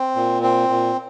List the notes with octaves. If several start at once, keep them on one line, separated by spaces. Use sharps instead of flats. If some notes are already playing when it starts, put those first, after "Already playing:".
Already playing: C4
A#2
C4
A#2